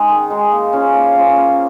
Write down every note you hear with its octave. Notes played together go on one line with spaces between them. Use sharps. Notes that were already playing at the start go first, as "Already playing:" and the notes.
Already playing: G#3 D#4 G#4
D#3
G#3 D#4 G#4
A#3
C#4 F4 C5
A#3
C#4 F4 C5
A#3